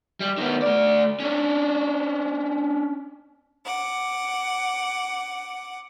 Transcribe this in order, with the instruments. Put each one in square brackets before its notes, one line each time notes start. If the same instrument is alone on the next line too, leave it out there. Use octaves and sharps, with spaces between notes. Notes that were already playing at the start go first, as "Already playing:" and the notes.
[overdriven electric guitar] G3
D#3 B3
A3 D5
C#4 D4
[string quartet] F#5 D6